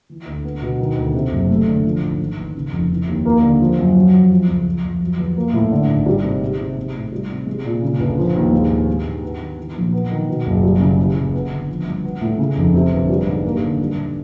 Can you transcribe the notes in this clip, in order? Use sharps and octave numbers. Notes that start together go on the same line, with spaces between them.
E3
D2
B3
B2
D#3
D2
C3
F#1
A3
D3
F3
G#1
D#3
E2
C#3
F1
E3
D#2
A#3
D3
F3
F#2
F#3
F2
F3
C#2
F3
F2
F#3
E2
A#3
A2
D3
G#1
G3
C3
G#3
C3
G#3
A2
G3
C3
G#3
A#2
C#3
G1
F3
D#2
G#3
G#2
G#3
G#2
B3
D#3
E3
A#1
B3
D#3
B2
F#1
G3
C#3
E3
A1
B3
D3
F3
G2
B3
A2
C#3
F1
C3
G1
G3
G#2
A#3
D3
G3
G#2